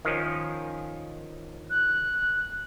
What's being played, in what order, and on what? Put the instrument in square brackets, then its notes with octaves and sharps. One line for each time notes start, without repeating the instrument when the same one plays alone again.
[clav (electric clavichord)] D#3 F3 C#4
[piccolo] F#6